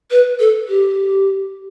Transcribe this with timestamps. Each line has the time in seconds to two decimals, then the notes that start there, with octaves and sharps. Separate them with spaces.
0.11 B4
0.40 A4
0.69 G4